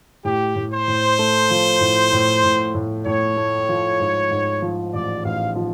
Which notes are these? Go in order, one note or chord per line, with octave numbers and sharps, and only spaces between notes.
A2 G4
A2
C5
A2
A3
F3
A2
A2
A2
A2
A2 C#5
A3
F3
G#2
G#2
F3
A1 D5
A1 F5
F3